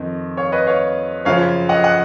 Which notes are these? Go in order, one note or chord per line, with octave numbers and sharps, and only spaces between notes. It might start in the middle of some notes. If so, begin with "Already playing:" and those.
Already playing: F2 D#3 D#5
C#5 F5
B4 D#5
C#5 F5
F#2 C#3 F3 C#5 F5
D#5 F#5
D#5 F#5